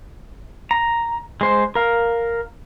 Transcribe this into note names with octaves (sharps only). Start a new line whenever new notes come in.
A#5
G#3 C5
A#4 F5